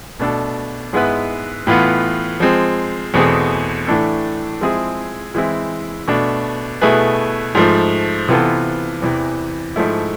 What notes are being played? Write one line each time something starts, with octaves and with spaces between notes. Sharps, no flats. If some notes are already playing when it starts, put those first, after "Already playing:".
B2 A3 D4 A4
G#2 G#3 B3 E4 B4
A2 E3 B3 F4
F3 G#3 C4
E2 B2 A3 C4 G#4
A2 E3 A3 D4 A4
F3 G#3 C4 E4 G#4
E3 G#3 C4 E4
B2 A3 D4
B2 A3 E4 G#4 B4
G#2 F3 A3
C3 E3 B3 F4 A4
E2 C3 E3
G#2 F3 A3 E4